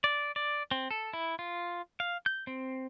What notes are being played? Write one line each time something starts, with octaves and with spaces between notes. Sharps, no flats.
D5
D5
C4
A4
E4
F4
F5
G6
C4